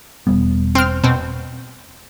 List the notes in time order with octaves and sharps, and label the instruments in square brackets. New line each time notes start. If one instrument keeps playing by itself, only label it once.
[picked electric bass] E1 G3 B3
[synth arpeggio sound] C4 F6
B2 C4